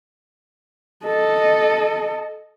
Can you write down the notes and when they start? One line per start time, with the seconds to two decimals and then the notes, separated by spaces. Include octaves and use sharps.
1.04 A4 D#5